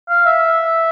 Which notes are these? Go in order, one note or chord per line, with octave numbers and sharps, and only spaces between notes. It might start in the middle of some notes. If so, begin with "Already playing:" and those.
F5
E5